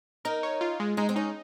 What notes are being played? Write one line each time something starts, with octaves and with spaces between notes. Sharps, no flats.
D#4 A#4
C#5
F4
G#3
G#3 D#4
C4
C#4 D#4